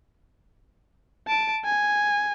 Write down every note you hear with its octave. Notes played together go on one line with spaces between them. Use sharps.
A5 D7
G#5